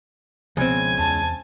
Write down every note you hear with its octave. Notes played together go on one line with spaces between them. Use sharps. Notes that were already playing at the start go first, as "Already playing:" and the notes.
C#2 B2 F3 B3 C4 G#5
E2 A5